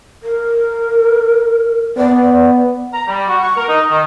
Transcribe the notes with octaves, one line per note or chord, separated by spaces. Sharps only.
A#4
B3 D5
A#5
G3
F#4
C#6
A#4
D#4
D#3